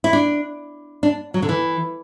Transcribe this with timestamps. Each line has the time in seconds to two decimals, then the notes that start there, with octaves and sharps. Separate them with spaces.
0.04 E4
0.13 D4
1.03 D4
1.34 F#3
1.42 D3
1.49 E3